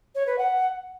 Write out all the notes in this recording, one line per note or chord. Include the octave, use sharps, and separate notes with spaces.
C#5
B4
F#5